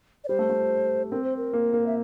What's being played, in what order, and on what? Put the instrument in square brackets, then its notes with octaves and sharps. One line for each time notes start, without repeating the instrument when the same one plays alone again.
[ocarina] D5
[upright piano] G3 [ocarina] C5
[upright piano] A3
A3
[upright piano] C4 [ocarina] A#4
[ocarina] C5
A#4
[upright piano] A#3
A#3
[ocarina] E5